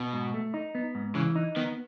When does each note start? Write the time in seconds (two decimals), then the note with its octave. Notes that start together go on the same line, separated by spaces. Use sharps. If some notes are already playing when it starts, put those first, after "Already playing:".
Already playing: B2
0.13 G#2
0.34 A3
0.54 D#4
0.75 B3
0.95 G#2
1.15 C#3 E3
1.36 D#4
1.56 D#3 B3